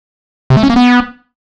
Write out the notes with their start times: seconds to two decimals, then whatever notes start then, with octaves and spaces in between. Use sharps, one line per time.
0.50 C3
0.57 A3
0.63 C#4
0.70 A#3
0.76 B3